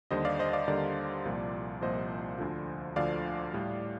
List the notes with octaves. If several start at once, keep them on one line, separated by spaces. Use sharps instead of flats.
D#2 D3 G3 C5 D#5
D5 F5
C5 D#5
D5 F5
D#2 D3 G3 A#4 D5
C2 A#2 F3
C2 A#2 F3 C5 D#5
D2 D3 F3
D2 D3 F3 D5 F5
A2 G3